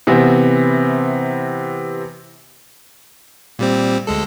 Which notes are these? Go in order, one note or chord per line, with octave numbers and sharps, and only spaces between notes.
C3 E3 B3 C4
A#2 G3 C4
D2 G#3 A4